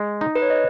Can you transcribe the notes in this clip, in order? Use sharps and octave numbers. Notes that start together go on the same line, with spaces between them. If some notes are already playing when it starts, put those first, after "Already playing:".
Already playing: G#3
D#4
B4
C#5
D#5